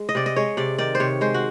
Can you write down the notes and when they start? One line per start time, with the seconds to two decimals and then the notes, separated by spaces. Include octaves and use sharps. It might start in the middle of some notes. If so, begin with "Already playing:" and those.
Already playing: G#3
0.09 D#5
0.15 C3 D5
0.26 D#5
0.36 G#3 C#5
0.57 C3 D5
0.78 D#3 D5
0.95 C5
1.00 C3 C#5
1.21 G#3 C5
1.34 F#4